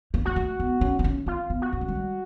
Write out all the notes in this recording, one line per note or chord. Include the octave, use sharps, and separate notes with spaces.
A#3
A#3 F#4
A3
B3
C#4
C4
C#4
C4 F4
B3
F#4
C#4
A3
G#3
G3